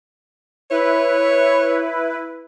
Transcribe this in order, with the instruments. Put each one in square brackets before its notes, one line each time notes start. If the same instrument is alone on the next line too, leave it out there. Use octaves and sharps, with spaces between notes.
[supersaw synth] E4 B4 [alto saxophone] C#5